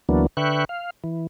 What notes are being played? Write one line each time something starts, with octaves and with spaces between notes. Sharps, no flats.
D2 E3 F#3 A#3 B3 D4
D3 B4 E5 G5 C#6 F#6
F5
E3